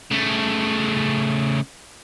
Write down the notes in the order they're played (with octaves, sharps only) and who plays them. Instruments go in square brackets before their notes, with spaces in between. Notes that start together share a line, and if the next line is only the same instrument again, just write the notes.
[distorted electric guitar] C#3 A3